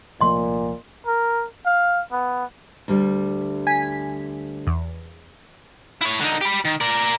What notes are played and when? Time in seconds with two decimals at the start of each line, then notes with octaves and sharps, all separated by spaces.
0.21 C2 A#2 F3 A3 D#5 C6
1.06 A#4
1.66 F5
2.12 B3
2.88 D2 G3
3.67 G#5 B6
4.67 E2
6.01 E4 C#5
6.21 D3 D#4
6.41 G4 B5
6.65 D#3
6.81 A#4 D5